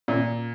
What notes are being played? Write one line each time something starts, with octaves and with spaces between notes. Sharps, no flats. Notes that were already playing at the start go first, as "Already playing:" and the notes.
A#2